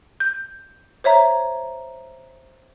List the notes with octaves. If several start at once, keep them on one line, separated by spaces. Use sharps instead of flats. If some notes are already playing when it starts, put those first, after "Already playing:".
G6
C5 C#5 E5 A#5